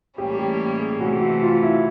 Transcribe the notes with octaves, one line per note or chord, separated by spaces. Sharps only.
A2 E3 G3 A#3 C#4 G4
G4
G#4
C3 E3 A3 F#4
F#4
F4
E4